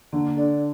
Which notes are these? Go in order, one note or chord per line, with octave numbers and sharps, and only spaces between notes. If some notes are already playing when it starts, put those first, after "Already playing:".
D3 A#3
D4 A4 D5